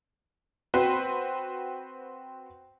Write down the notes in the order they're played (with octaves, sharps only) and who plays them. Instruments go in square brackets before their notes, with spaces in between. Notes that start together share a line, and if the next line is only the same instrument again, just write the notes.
[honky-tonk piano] C4 F#4 B4 C5